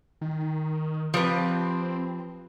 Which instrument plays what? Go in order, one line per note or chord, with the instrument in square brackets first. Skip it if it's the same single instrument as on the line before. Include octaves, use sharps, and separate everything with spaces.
[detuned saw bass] D#3
[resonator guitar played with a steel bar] F3 G4 B4 [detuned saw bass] C4